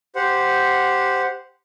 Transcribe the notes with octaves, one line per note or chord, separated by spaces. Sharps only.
G4 C5 F#5